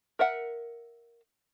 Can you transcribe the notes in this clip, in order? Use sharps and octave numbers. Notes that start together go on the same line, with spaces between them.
A#4 E5 F#5